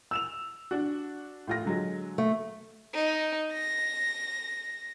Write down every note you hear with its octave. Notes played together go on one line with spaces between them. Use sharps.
E6 E7 F7
D4 F#4
A2 F4 A#6
D3 F#3 G#3
A3
D#4
A#6